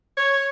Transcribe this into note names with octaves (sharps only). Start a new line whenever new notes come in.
C#5